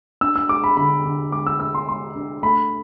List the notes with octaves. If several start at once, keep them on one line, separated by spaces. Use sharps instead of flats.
D4 E6
E6
G#3 D6
B5
D3 B5
D3
G#3 D6
E6
D4 E6
C6
G#3 C6
D4
A3 B5